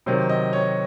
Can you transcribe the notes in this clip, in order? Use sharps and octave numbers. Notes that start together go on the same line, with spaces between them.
C3 D#3 F#3 C5
D#5
C#5